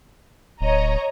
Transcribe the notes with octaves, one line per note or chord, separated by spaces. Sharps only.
D1 C#5 D#5 A#5